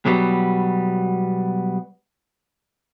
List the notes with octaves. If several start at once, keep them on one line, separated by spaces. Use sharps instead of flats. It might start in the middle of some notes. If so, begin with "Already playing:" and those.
B2 F#3 G3 B3